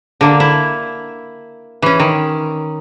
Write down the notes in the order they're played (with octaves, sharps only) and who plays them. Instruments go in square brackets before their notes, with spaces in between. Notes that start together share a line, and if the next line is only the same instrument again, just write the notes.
[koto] D3 A#3
E4
E3 C#4
D#3